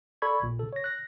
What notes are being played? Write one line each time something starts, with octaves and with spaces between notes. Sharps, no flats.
A4 D5 B5 C#6 G#6
A#1 A#2
C#3 A4
C#5 A#6
F#6 A#6